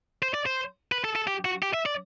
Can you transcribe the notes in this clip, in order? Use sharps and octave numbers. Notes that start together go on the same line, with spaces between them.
C5
D5
C5
B4
A4
A4
G4
F#4
G4
E5
D5